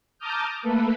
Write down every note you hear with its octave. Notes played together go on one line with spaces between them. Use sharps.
A5 A#5 D6 D#6 F6 G6
A3 A#3 A4 B4